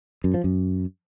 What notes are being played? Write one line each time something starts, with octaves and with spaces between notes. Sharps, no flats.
F#2
F3
F#2